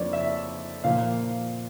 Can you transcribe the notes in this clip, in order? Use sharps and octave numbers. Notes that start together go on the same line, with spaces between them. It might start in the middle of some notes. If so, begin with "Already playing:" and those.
Already playing: F2 D3 F3 A#3 C#5 D5
E5
A#2 F3 A#3 F5